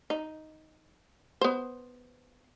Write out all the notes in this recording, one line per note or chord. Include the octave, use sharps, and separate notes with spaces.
D#4
B3 C5